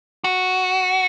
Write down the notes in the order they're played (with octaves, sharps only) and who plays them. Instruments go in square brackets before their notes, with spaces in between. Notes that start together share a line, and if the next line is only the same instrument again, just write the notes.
[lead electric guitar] F#4